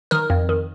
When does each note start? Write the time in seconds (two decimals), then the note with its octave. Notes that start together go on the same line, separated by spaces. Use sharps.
0.11 D#3 A#4
0.30 F2
0.49 D#3